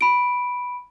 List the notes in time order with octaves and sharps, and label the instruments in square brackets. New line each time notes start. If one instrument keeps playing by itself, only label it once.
[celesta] B5 D7